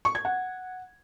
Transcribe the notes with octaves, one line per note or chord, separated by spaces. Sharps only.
C#6
G#6
F#5